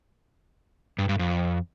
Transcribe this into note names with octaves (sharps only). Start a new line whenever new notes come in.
G2
G2
F2